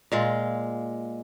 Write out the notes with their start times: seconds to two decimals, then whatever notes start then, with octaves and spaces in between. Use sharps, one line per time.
0.12 A#2 G#3 F4